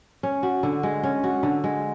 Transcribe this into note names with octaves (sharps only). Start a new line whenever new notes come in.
C#4
F#4
D3
G#3
C#4
F#4
D3
G#3